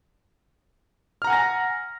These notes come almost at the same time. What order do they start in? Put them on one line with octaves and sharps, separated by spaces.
F6 A#5 F#5 G#5 A#6